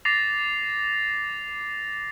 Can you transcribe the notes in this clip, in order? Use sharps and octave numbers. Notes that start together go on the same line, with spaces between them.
D6 A6 A#6 C7 F7